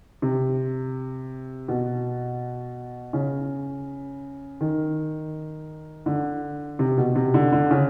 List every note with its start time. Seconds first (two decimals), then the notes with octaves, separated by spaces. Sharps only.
0.22 C3
1.68 B2
3.13 C#3
4.61 D#3
6.06 D3
6.79 C3
6.98 B2
7.16 C3
7.34 D3
7.52 D3
7.71 C#3